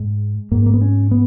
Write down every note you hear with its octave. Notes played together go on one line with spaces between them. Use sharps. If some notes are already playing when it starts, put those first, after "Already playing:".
Already playing: G#2 G#3
G#2 A#3
A#3
B3
C#4
B3